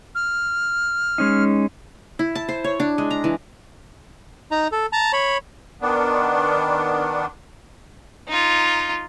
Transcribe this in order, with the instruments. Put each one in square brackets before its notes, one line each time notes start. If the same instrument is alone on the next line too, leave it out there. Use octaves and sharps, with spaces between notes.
[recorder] F6
[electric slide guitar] G#3 C#4 D#4
[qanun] E4
A5
C5
C#5
D4
G#3
A#5
E3
[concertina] D#4 A#5
A4
A5 A#5
C#5 B5
[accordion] D#3 B3 D4
[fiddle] D#4 F4